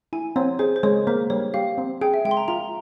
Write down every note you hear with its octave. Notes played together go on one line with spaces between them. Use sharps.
E4 G#5
C4 C#5
G#4 C5
C5
G#3 C#5
A#3 C5
G3 C#5
G4 F5
C4
G#4 G5
E5
G#3 G5
C6
A#5
F4 A#5